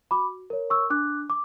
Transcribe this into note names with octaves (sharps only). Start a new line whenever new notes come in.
F#4 B5 D6
A#4 C#5
C#6 E6
D4 D6 F#6
D6